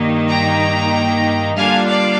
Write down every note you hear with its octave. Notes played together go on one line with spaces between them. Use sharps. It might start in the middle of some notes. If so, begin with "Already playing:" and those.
Already playing: G2 D#3 A#3 D#4
G5 A#5
D3 G3 A#3 D4 F4 F5 G#5
D5 F5